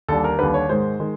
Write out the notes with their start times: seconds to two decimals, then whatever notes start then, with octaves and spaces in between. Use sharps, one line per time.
0.08 D#2 D3 G3 A4
0.24 A#4
0.39 D#2 D3 G3 B4
0.54 C#5
0.69 G#2 D#3 G#3 C5
0.99 D#3 G#3